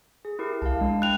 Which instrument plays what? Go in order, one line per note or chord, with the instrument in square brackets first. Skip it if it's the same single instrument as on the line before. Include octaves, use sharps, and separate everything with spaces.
[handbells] G#4
E4 G4 A#4
[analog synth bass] C2 [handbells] F5 A5
[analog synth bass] G#3 [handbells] D4
[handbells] E4 G5 [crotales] F#6 F7